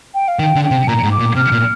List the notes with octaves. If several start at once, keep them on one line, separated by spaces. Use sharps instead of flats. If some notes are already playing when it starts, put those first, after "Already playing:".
G5
F5
D#3 G5
D3
G5
C3
A#2 A#5
G#2
D6
A#2
C3 F6
A#2